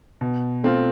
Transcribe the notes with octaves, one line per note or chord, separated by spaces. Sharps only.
B2
A3 C4 F4